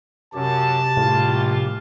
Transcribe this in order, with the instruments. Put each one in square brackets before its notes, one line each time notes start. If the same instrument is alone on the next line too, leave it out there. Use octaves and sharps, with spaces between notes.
[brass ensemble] F#2 [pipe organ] C3 G4 [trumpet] A5
[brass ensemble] A#1 G3 F4 [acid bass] A2